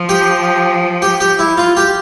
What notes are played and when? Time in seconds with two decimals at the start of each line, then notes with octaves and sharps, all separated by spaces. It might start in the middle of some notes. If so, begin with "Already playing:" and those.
Already playing: F3
0.09 G4
1.02 G4
1.20 G4
1.39 E4
1.58 F4
1.77 G4